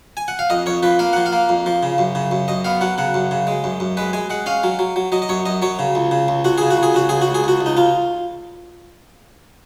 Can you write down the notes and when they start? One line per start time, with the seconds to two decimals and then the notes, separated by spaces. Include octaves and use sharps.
0.17 G#5
0.28 F#5
0.39 F5
0.50 F2 D#5
0.66 F2 C#5
0.83 F3 B4
0.99 A#3 F5
1.13 F3 F#5
1.26 F5
1.33 A#3
1.49 F2
1.66 F3
1.83 C#3
1.98 F#2
2.15 C#3
2.31 F#2
2.48 F#2 D#5
2.65 B3 F5
2.81 F#3 F#5
2.98 C#3 F#5
3.14 F#2
3.31 C#3
3.47 G#3
3.64 F#2
3.80 F#2
3.97 G#3 B4
4.13 G#3 G#5
4.30 G#3 F#5
4.46 C#4 F5
4.63 F#3
4.79 F#3
4.96 F#3
5.12 F#3 D#5
5.22 D#5
5.29 F#2 C#5
5.46 F#2 D#5
5.62 F#3 C#5
5.79 C#3
5.95 C#2
6.11 C#3
6.28 C#2
6.45 C#2 F#4
6.58 C#3 G#4
6.70 F#4
6.77 C#2
6.83 G#4
6.94 C#3 F#4
7.09 C#2 G#4
7.22 F#4
7.28 C#2
7.35 G#4
7.44 C#2 F#4
7.61 C#2
7.66 D#4
7.77 C#2 F4